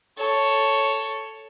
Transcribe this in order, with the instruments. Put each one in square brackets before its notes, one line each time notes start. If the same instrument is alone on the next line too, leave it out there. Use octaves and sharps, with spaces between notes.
[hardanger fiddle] A4 C#5